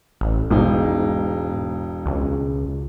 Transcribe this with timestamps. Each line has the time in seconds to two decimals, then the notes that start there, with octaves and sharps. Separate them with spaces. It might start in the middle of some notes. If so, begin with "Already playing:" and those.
0.21 A1
0.50 E1 G#2 D#4
2.06 C#2